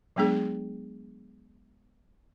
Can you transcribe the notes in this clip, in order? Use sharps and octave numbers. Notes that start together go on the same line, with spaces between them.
F#3 G#3 B3 D4 G#4